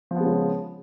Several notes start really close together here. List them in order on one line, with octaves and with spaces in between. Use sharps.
F3 B3 G#3 C#3